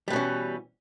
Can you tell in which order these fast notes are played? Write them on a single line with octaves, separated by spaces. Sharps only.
G3 B2 C#4 E3